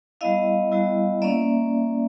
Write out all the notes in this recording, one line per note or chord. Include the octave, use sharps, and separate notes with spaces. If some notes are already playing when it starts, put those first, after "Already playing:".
G3 B3 E4 D#5 F5
G3 B3 E4
A#3 C#4 D5 E5